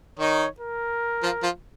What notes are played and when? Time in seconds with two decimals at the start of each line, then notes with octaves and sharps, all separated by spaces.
0.19 D#3 D#4 C#5
0.60 A#4
1.23 F3 F4
1.43 F3 F4